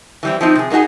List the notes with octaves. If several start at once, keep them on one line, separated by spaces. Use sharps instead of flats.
E3 G3 C4
F3 C4 D#4
C3 G#4
G#3 A#3 D#4 F#4 G#4